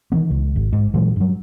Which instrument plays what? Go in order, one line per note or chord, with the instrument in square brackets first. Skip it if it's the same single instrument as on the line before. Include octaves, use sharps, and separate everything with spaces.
[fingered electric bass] D#3 E3 B3
C#2
G#1
G#2
A#2 E3 F#3 G#3
G2 F#3